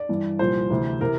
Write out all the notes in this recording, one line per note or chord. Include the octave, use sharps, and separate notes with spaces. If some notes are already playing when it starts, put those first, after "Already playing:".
Already playing: D5
G2 E3
C2 A#2 F3 C5
D2 C3 E3
C3 E3 A#4